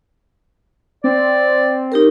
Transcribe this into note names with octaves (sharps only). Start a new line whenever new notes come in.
C4 D5
D#4 G4 A#4